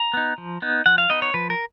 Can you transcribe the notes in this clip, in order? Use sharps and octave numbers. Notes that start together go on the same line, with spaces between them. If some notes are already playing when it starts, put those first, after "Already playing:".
Already playing: A#5
B3 D#4
F3
B3 D#4
F3 F#5
F5
B3 D#4 D#5
C#5
F3 B4
A#4